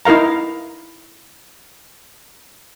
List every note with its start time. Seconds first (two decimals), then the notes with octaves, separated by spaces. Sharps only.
0.05 D#4 E4 A#4 F5 A#5